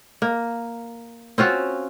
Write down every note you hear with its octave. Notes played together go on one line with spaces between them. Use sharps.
A#3
C4 C#4 F4 F#4